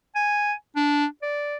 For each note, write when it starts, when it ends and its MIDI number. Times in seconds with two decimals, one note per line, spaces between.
0.15 0.53 80
0.76 1.05 62
1.22 1.57 74